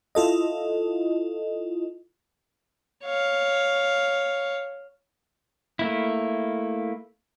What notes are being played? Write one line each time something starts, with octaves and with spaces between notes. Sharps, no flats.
E4 F4 A4 D#5
C#5 F5
A3 A#3 E4